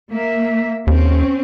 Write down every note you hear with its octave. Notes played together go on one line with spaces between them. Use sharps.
A#3 E5
D#2 C4 C#4